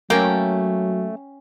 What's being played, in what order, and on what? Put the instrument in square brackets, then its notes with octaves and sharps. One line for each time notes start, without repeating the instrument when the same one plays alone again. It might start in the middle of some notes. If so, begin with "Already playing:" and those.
[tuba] F#3 [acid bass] A3 [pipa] A#3 [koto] C#4 G5